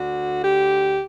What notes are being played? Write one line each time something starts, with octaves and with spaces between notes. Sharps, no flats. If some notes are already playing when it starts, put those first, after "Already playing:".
Already playing: D2 D3 F#4
G4